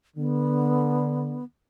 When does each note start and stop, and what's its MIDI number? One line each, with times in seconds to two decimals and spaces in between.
0.17 1.38 50
0.17 1.44 59